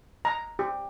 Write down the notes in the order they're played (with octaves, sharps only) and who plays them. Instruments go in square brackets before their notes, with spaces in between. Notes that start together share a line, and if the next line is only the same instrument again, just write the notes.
[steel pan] A#5
G4